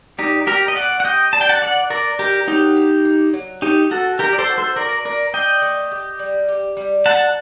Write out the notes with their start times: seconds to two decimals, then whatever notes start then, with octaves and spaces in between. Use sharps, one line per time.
0.18 A#2 D#4 G4
0.47 A#2 G4 A#4
0.68 D#5
0.76 A3 D5 F#5
1.00 F#5
1.05 G4 D#5 G5
1.33 D4 A5
1.41 G5
1.49 F#5 A5
1.62 D#3 D5 F#5
1.90 D4 A#4 D5
2.19 D#3 G4 A#4
2.48 F#3 D#4 G4
2.77 A#3
3.05 A#3
3.33 F#3
3.62 A3 D#4 G4
3.91 C4 F#4 A4
4.19 D#3 G4 A#4
4.33 D5
4.39 A4 C5
4.48 F#4
4.58 A4 C5
4.76 A3 A#4 D5
5.05 D4 A#4 D5
5.33 D4 D#5 G5
5.62 A3
5.92 G4
6.19 G3
6.48 G4
6.77 G3
7.05 D#4 F#5 A5